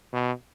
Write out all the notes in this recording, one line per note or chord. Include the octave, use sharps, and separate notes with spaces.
B2